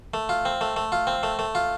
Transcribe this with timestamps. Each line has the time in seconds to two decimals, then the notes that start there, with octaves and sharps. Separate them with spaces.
0.14 A3
0.29 F4
0.45 C4
0.61 A3
0.76 A3
0.92 F4
1.07 C4
1.23 A3
1.39 A3
1.55 F4